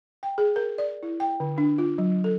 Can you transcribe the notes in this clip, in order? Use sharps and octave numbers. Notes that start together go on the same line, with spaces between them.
G5
G#4
A#4
D5
E4
G5
D3
D4
F4
F#3
A4